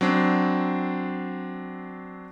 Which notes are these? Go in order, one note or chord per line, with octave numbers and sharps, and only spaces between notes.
F#3 C4 D4